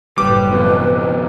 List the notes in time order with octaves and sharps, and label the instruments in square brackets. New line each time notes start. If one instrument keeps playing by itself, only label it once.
[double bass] F#1 A2 [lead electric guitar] G3 [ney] B4 [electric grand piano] D6
[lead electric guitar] F2 B2